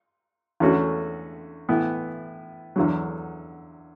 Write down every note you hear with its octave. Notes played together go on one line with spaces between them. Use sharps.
E2 D3 A3 C#4 F#4
A2 E3 B3 E4
E2 D3 F#3